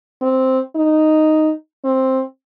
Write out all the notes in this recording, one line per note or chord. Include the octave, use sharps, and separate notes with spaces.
C4
D#4
C4